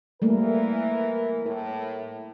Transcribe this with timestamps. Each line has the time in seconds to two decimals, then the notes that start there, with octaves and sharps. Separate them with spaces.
0.22 E3 G3 A3 A#3 A#4
1.46 A2 A#4